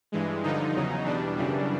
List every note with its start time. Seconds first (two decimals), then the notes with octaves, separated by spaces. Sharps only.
0.12 G2 E3 G#3
0.43 G2 D3 F3 D#4
0.75 E2 C#3 F#3
1.05 E2 B2 G3 D4
1.37 F#2 C#3 E3 G3